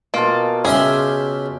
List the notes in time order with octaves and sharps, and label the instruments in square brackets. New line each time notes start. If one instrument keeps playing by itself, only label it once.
[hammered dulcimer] B2 F4 A5 [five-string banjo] A#3
[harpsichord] C#3 E5 C6 [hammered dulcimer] G4 [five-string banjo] G#4